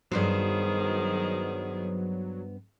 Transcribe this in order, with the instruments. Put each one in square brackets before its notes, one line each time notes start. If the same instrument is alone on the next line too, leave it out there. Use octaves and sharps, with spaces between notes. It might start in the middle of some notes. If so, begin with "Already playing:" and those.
[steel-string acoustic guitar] G2 B3 C5 [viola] D#3 G#4 [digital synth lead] F#3